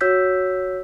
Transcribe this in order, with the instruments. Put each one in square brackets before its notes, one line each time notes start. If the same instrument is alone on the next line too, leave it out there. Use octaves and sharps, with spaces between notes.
[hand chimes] F#4 C#5 E6 G6 B6